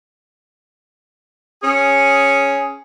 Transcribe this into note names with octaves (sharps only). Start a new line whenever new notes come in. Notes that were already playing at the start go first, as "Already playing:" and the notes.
C#4 G#4